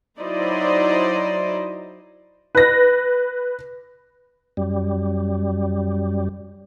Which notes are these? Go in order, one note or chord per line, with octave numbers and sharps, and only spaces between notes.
F#3 D#4 E4 C5 D5 D#5
B4 A#6
F#2 G3